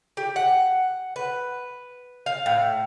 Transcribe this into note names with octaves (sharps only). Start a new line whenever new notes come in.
G4
F#5
B4
F5
A2